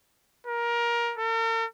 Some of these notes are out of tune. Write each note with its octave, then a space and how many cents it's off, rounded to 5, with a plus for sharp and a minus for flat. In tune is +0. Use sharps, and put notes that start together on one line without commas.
A#4 +20
A#4 -45